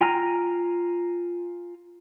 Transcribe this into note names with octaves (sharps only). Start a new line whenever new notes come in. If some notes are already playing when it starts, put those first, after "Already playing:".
F4 G5 G#5 A#5 F6